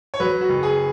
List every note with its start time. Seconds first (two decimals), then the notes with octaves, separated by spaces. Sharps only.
0.14 C#5
0.20 F#3 B4
0.41 F#4
0.49 F#1
0.63 G#4